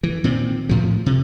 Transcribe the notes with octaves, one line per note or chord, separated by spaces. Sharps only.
E3
A#2 D#3 C4
A2 F3
C3